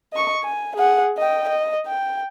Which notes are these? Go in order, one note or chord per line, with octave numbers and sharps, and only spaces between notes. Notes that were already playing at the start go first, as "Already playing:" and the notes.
D#5 C#6
G#5
G#4 F#5
D#5 G5
D#5
G5